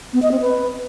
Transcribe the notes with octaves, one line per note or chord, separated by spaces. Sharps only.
B3
D#5
C4
B4